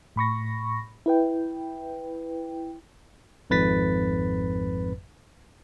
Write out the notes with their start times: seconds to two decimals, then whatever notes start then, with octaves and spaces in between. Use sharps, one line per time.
0.16 A2 B5 C#6 A#6
1.06 E4 B4 G5
3.50 G#1 F2 G#2 B4 A6 B6